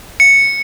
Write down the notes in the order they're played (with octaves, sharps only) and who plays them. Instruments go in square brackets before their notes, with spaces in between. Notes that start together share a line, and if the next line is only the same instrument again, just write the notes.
[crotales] C#7